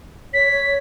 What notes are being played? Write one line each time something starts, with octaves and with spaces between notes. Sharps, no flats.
C#5 B6